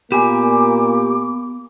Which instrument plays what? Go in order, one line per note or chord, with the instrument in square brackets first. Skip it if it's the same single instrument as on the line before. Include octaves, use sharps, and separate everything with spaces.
[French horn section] A#2 A#3 [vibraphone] B3 [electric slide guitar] G4 G#5 [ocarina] D6